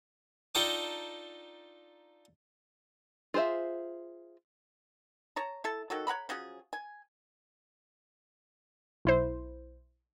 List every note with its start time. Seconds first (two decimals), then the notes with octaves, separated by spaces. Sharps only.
0.55 D4 D#4 F4 A4 G5 A#5
3.34 F4 G#4 C5 D5 E5
5.36 C#5 A5 A#5
5.64 E4 A4 A5
5.90 D#3 F#3 F#4 A4
6.07 C#5 F#5 A#5 B5
6.29 F3 F#3 C#4 G#4
6.73 G#5
9.05 B1 E4 C5